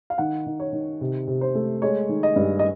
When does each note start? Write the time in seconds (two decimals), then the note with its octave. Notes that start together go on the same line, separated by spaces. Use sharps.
0.10 F5
0.18 D#3 F#5
0.47 D#3
0.60 C#5
0.73 D#3
1.01 C3
1.28 C3
1.41 C5
1.55 A3
1.82 G#3 C#5
2.09 D#3
2.23 D#5
2.36 G2
2.59 D#5